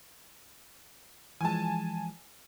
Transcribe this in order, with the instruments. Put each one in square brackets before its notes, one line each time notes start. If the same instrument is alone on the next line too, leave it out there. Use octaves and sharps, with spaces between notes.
[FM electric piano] E3 F3 G#3 [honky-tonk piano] G#5 A5